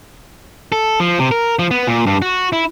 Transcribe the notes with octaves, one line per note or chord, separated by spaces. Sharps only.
A4
F3
C3
A#4
F3
B3
A#2
G2
F#4
E4